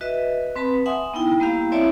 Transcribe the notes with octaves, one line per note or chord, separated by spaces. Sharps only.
F#4 B4 D#5 E5
C4 B4 A5 B5
E5 F#5 G#5 C6 D#6
B3 D#4 E4 G5
G3 A#3 B3 E4 G4 F5
C4 E4 C#5 D5 E5 A5